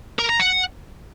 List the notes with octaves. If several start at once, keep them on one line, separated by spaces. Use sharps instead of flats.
A#4
A#5
F#5